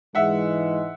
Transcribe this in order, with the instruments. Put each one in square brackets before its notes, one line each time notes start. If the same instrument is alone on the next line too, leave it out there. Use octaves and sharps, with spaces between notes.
[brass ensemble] G#2 E3 G#3 [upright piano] E5 F#5